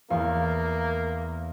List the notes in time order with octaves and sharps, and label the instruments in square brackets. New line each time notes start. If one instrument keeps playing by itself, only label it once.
[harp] E2 F5 C#6 [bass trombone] A#3